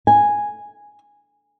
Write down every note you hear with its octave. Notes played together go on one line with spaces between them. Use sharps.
G#5